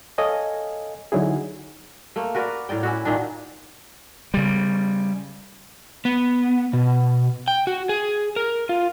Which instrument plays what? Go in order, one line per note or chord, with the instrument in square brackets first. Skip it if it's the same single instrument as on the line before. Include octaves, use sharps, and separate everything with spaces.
[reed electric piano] A4 C#5 D#5 F5 G#5
D3 F#3 D#4 E4 G#4
[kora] A3 A#3
F#4 A#4 B4 D5
A2 A#4 D5 G5
C#4 E4 F#4
A#2 D#3 D4
[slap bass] C#3 G3
[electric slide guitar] B3
B2
G5
F#4
G#4
A#4
F4